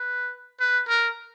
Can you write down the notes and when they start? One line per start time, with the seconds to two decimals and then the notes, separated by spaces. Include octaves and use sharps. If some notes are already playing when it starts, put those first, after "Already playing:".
Already playing: B4
0.60 B4
0.88 A#4